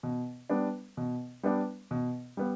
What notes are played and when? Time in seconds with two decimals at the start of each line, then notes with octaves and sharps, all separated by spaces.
0.03 B2
0.49 G3 B3 D4
0.97 B2
1.43 G3 B3 D4
1.91 B2
2.37 G3 B3